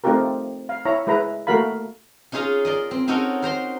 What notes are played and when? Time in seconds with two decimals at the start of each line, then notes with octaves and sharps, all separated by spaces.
0.04 A3 C4 D#4 F4 G4 A#4
0.69 F5
0.85 E4 C#5 A#5
1.07 G#3 E4 B4 A#5
1.47 A3 A#3 F#4 A#4 F5 B5
2.32 C#4 D#4 F4 G#4 F5 A#5
2.65 A#4 D5 D#5
2.91 C4
3.08 C4 C#4 D#4 F#4 A4 A#4
3.42 A#4 C5 A#5 C6